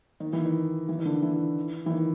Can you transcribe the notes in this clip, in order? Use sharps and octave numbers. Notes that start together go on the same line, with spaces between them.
D#3
E3
D#3
E3
D#3
D3
E3
E3
D#3